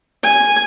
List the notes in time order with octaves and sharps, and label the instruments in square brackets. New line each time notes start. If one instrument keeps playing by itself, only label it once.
[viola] G#5